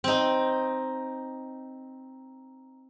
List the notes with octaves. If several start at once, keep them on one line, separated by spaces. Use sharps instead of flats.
C4 D#4